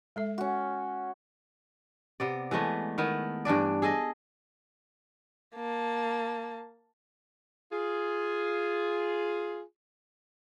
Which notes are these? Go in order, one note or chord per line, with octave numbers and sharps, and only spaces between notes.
G#3 A4 E5
C#4 F#4
C3 B3 D5
E3 G#3 A3 B3
D#3 B3 E4
G2 E3 D4 D5
G#4 A4 D#5
A#3 A5
F4 G#4